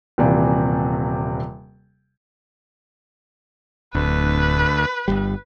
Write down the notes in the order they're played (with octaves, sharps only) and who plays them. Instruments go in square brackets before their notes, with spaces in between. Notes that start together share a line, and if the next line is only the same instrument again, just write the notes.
[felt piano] D#1 C3 E3 A#3 D5
[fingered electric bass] D1 [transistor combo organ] D2 [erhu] B4
[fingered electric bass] G1 C2 G3